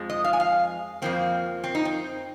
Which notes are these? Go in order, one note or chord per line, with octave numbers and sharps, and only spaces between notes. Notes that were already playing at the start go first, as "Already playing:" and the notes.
Already playing: F2 F3 G#3
D#5
F5
G#5
F5
F2 F3 A#3 C4
C4
D#4
C4